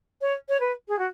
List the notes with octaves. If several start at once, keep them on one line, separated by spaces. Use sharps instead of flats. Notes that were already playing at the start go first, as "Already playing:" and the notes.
C#5
C#5
B4
G#4
F#4